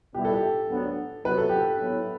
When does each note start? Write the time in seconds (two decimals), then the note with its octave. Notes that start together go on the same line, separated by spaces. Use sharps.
0.14 B2 G3 B3 E4 G4
0.25 A4
0.34 G4
0.70 D2 D3 F#3 B3
1.25 C3 F#3 B3 B4
1.38 A4
1.49 G4
1.60 A4
1.80 F#3 B3 E4 B4